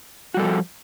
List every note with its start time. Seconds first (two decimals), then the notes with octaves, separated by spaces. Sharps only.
0.34 F#4
0.37 G3
0.40 A4
0.42 F3